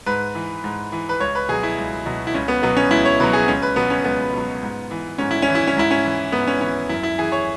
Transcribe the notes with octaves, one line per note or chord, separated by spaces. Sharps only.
G#2 B4
E3
G#2
E3
B4
C#2 C#5
B4
B2 F#3 G#4
E4
C#2
B2 F#3
E4
C#2 C#4
B3
B2 F#3 B3
C#4
C#2 E4
C#5
B2 F#3 B4
G#4
C#2 C#4
B4
B2 F#3 B3
C#4
C#2 B3
B2 F#3
G#2
E3
G#2 C#4
E4
C#4
E3
E4
C#4
G#2 E4
C#4
E3
G#2 B3
C#4
E3 C#4
F#2 E4
E4
E3 G#4
C#5